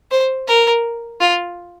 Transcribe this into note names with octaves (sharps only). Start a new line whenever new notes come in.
C5
A#4
F4